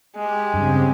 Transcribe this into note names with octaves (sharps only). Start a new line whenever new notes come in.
G#3 G4
G2 C#3 C4 G4